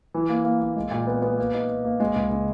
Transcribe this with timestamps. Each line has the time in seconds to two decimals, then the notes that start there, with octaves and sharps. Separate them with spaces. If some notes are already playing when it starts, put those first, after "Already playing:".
0.14 E3
0.29 A#3
0.44 A#3
0.60 A#3
0.76 G#3
0.91 A#2
1.07 B3
1.22 B3
1.38 A#3
1.54 D#4
1.69 D#4
1.85 A#3
2.00 G#3
2.16 C#2
2.31 C#3